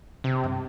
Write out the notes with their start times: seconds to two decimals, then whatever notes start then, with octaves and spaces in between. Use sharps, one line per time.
0.24 C3
0.44 G2